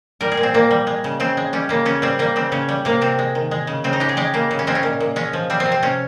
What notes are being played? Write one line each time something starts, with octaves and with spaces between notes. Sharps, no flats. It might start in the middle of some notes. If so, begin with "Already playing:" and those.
G3 A#4
G#4
A#2
C4
A#2 A#3
G3
G#3
C#3
C#3 C4
G#3
G3 C#4
C#3 A#3
C#3 C#4
G3 C4
G3 A#3
C#3 C4
C#3 C#4
G3
C3 A#3
C3 C4
G#3
D#3
G#3
C#3
C#3 C4
D#4
G#3 G4
G#4
G#3 G4
C#3 A#3
C#3
C#4
G#3 C4
C#4
A#2
A#2
G#3 C#4
F3
G3 C4
C4
C3
C4
C3 C#4